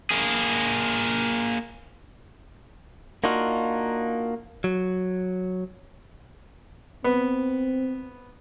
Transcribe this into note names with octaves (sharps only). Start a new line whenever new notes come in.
A#3 G#4
A#3 D4 D#4 F4 F#4
F#3
B3 C4